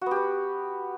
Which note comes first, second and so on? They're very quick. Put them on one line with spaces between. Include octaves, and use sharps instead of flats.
F#4 B3 G4 B4